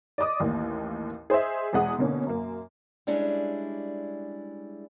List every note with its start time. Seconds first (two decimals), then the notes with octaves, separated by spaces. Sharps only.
0.18 D5 D#5 D6 D#6
0.40 A1 D#2 A#3
1.30 G#4 C5 D#5 E5
1.73 E2 B2 G#3 F#5 D#6
1.98 B2 D3 A#3 C#4
2.27 F#2 A#3
3.07 G3 G#3 C#4 D4 E4 G#4